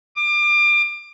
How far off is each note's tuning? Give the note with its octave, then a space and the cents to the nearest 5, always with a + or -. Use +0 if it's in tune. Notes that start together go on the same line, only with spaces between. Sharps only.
D6 +30